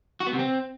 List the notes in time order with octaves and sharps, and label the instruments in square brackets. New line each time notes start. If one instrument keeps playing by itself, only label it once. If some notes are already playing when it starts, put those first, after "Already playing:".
[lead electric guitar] F#4
B3
C3
C4